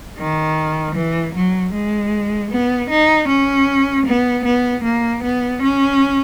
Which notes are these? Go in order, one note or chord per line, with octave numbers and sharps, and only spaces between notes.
D#3
E3
F#3
G#3
B3
D#4
C#4
B3
B3
A#3
B3
C#4